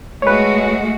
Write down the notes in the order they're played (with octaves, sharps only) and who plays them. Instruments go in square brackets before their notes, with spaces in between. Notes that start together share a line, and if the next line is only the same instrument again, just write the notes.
[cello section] G#3 A3 F#4 [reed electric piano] B4 C#5